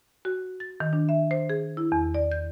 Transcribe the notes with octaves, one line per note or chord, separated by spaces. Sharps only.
F#4
A6
D#3
D4
E5
C5
G#4
E4
E2
D5
G6